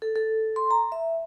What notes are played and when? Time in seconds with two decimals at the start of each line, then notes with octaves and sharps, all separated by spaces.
0.02 A4
0.16 A4
0.56 C6
0.71 A#5
0.92 E5